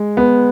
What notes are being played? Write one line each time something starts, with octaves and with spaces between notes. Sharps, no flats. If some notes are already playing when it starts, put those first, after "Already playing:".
Already playing: G#3
B3